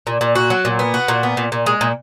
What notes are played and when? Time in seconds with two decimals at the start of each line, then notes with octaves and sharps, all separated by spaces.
0.07 A#2
0.21 A#2
0.35 F#4
0.50 F#3
0.65 A#2
0.79 B3
0.94 F#4
1.08 A#2
1.23 B3
1.37 A#2
1.52 A#2
1.66 G#3
1.81 A#2